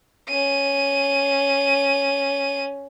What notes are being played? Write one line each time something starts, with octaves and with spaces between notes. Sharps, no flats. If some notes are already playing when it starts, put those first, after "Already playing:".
C#4 D#7